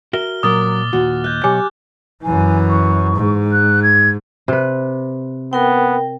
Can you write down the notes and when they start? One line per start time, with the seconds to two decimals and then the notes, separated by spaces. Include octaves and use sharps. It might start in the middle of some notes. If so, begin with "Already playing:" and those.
0.13 F#4 A#4 E5 F6 G7
0.43 A#2 F#3 A#4 D6 D#6 A6 G7
0.93 D#2 A#2 F#4
1.24 D#5 F#6 G6
1.44 B2 F#3 G4 C#5 G#5 D6
2.23 F#2 E3 G#5
2.69 C#6
3.16 G#2
3.52 F#6
3.83 G#6
4.48 C3 B4
5.53 B3 A#4 G5